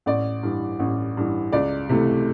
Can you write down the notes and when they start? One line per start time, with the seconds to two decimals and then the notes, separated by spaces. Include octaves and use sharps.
0.06 A1 D5
0.43 G2 E3
0.79 A1
1.17 G2 E3
1.52 C#2 D5
1.89 C3 E3 A3